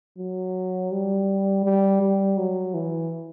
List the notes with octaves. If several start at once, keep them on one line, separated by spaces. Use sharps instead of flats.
F#3
G3
G3
G3
F#3
E3